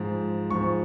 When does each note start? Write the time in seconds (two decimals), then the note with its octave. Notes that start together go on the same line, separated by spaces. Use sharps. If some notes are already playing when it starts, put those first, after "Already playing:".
Already playing: G#2 F3
0.50 G#2 F3 C#6